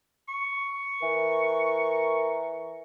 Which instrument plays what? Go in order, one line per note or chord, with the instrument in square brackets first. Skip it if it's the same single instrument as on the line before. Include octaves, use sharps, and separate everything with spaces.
[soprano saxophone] C#6
[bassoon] E3 [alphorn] A#4